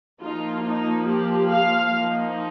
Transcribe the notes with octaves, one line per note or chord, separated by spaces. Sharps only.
F3 A#3 D#4 F4
D#4
G4
F5
F3 A#3 D#4